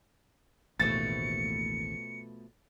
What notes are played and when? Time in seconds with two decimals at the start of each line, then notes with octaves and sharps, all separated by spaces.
0.80 A1 D#2 B2 F3 A3 A6 C#7